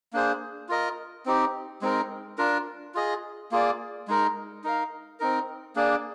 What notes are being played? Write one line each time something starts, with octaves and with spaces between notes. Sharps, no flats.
A#3 D4 G#4 C5
F4 A#4 D#5
C4 D#4 G4
G#3 C4 D#4 A#4
D4 F4 A#4
F4 G#4 D#5
A#3 F4 G#4 D5
G#3 D#4 A#4
D#4 A#4 F5
C4 D#4 A#4
A#3 D4 G#4 D5